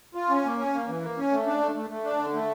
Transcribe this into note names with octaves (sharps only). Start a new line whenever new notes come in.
F4
C#4
A#3
C#4
A#3
E3
A#3
C#4
A3
D4
A3
A3
A3
D4
D3
A3